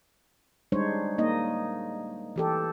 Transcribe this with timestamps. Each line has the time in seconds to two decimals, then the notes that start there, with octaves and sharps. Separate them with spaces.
0.72 G3 G#3 D4 D#4 C5 C#5
1.18 A#3 D#4 D#5
2.36 E3 G4 A4